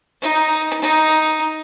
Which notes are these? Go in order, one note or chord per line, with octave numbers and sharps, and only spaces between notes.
D#4
D#4